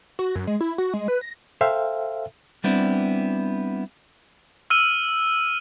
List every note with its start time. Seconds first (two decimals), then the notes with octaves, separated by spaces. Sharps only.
0.19 F#4
0.35 F#2
0.47 G#3
0.61 E4
0.78 F#4
0.94 G#3
1.08 B4
1.21 A#6
1.61 A4 C5 E5 F5 G5
2.64 G3 B3 C4 D4 E4
4.70 E6 F6 D#7